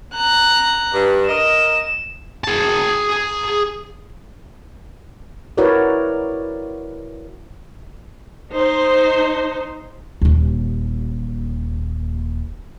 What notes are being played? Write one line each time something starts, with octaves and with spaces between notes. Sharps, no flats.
A#5 F#6
G2
A#4 D#5 E7
G#4 A5
E4 F#4 A#4 B4 C#5 D5
D#4 C5
D#1 D#2